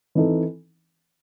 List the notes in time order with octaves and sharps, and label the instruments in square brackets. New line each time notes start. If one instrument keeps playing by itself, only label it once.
[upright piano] E3 C4 D#4 A4